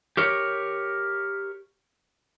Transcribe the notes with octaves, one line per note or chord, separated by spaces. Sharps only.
G4 A#4 C#5